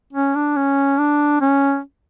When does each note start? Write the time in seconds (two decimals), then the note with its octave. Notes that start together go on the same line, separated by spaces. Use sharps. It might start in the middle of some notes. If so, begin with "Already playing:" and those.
0.13 C#4
0.35 D4
0.56 C#4
0.98 D4
1.41 C#4